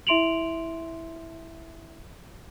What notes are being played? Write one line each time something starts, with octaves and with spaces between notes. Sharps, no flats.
E4 E5 C6 D7 F7 F#7